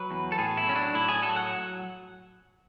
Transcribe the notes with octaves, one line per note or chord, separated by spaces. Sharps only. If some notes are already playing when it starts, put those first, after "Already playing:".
Already playing: F#3 B4
E2
A4
A2 G#4
E4
F#3 C#4
D4
A2 E4
G#4
F#3 A4
F#5